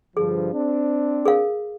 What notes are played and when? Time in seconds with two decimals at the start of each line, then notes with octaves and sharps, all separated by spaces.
0.17 G2 D3 F3 G#4
0.52 C4 D4
1.25 G#4 A#4 F5